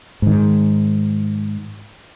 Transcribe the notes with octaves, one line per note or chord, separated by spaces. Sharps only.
G#2 D#3